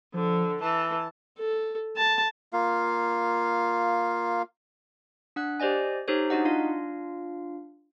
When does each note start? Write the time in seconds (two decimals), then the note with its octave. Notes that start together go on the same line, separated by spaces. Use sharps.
0.14 D3 F3
0.61 E3 A5
1.39 A4
1.97 A5
2.53 A#3 F4 F5
5.36 D4 F#5 F#6
5.60 G4 C5 D5 D#5 G#5
6.08 D#4 G4 A4 C5 C#5
6.30 D4 D#4 F#4 D#5 F#5
6.45 D4 F4 F5